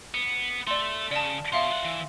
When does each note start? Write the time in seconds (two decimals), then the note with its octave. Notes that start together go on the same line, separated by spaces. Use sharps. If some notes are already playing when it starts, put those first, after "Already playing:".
0.14 B3
0.67 A3 A4 D5 C6
1.11 C#3 D5 A5
1.52 B2 E5 F5 C6
1.71 F4 F#5
1.85 E3